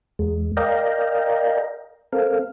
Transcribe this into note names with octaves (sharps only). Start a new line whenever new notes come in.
E2 G#3
A#4 D5 D#5 F5 G5 A#5
C4 A4 A#4 F5